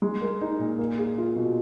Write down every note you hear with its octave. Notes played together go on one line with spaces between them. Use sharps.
G#3
A#4
D#4
A#2
A#3
G#4
F4
B2